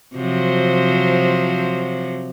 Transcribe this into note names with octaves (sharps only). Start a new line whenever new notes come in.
C3 F3 F#3